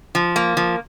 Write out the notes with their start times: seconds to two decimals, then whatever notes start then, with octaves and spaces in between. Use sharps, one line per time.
0.15 F3
0.36 A#3
0.57 F3